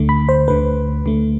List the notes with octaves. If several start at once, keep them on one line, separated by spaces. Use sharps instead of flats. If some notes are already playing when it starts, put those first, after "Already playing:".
Already playing: D2 D3 A3
B5
C5
D2 D3 A3 B4
D2 D3 A3